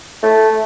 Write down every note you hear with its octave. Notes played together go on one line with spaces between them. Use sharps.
A3